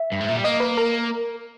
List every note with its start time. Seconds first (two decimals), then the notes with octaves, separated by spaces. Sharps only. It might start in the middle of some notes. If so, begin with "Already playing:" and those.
Already playing: E5
0.12 G2
0.20 G#2
0.28 A#2
0.36 G3
0.44 A#3 D#5
0.60 B4
0.77 A#4